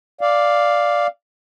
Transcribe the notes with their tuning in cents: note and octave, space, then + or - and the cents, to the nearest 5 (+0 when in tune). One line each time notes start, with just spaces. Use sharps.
D5 +0 F5 +0